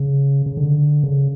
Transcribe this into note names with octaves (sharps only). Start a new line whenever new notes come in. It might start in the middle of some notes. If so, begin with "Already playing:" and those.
Already playing: C#3
C#3
D3
C#3